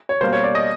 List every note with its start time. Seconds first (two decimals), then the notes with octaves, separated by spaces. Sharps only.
0.09 C#5
0.21 B2 G3 A#3 C5
0.33 C#5
0.44 D5
0.55 D#5